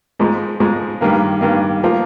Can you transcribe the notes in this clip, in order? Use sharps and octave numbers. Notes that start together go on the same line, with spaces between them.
G#2 F3 G#3
G#2 F3 G#3
G2 D#3 A#3
G2 D#3 A#3
F3 A#3